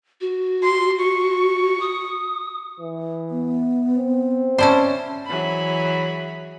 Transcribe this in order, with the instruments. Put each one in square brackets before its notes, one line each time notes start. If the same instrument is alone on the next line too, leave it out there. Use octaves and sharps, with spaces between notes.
[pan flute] F#4
[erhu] C6
C#6
[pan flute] D#6
[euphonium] E3
[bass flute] B3
[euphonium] C4
[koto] C#4 E4 C5 [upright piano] D5 A5
[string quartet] E3 F#3 G#4 B5